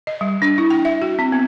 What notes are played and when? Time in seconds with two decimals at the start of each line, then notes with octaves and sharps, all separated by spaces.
0.07 D#5
0.21 G3
0.42 D4
0.58 E4
0.70 G5
0.85 E5
1.02 F#4
1.19 C4
1.32 B3